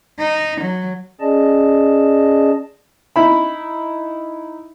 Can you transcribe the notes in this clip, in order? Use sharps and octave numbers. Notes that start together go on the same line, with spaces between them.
D#4
F#3
C#4 G#4 D5 D#5 A5
D#4 E4 E5 B5